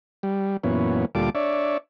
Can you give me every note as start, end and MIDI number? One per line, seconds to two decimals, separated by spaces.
0.23 0.57 55
0.64 1.05 42
0.64 1.05 46
0.64 1.05 52
0.64 1.05 59
0.64 1.05 61
1.15 1.30 38
1.15 1.30 46
1.15 1.30 55
1.15 1.30 65
1.15 1.30 69
1.15 1.30 86
1.35 1.77 62
1.35 1.77 73
1.35 1.77 74
1.35 1.77 76